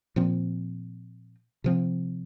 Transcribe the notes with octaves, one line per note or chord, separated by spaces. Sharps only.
A#2 F3 C4
C3 F3 C4